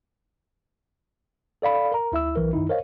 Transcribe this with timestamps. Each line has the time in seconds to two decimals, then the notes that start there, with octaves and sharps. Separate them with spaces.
1.62 A4 D5 F5 B5
1.92 A#4 A#5
2.12 D2 E4 E5 E6
2.36 B1 E3 A#4
2.53 F#2 D#3 D#4 E4
2.69 A#4 C5 C#5 D#5 F5